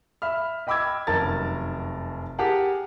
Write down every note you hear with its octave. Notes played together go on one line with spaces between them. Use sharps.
E5 B5 F6
D#5 G5 B5 D6 E6 G#6
F1 F#2 D#3 A#4 A5 A6
G4 G#4 A#4 F#5 A5